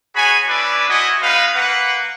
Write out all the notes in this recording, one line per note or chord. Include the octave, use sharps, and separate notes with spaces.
F#4 G#4 C#5 G#5 B5
C#4 D4 E4 B4 D5
E4 F#4 C5 D#5 G#5
G#3 B3 D#4 B4 F5
A#3 B4 F#5